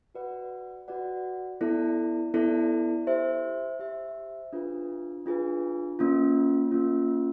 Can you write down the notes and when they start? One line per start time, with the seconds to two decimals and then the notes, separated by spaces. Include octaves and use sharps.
0.15 F#4 B4 D5 F#5
0.88 F#4 B4 D5 F#5
1.61 B3 E4 A4 D5
2.34 B3 E4 A4 D5
3.07 G4 C5 E5
3.79 G4 C5 E5
4.53 D4 F4 G#4 B4
5.26 D4 F4 G#4 B4
5.99 A#3 C#4 F4
6.71 A#3 C#4 F4